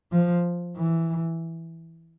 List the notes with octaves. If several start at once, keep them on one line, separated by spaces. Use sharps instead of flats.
F3
E3